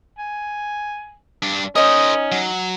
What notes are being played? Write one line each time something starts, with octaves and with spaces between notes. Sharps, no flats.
G#5
G2 D4
C#4 D#4 A#4 C5 D#5
F#3